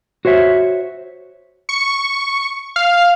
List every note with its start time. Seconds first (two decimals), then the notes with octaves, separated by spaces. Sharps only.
0.25 F#4 C5 C#5 E5
1.69 C#6
2.76 F5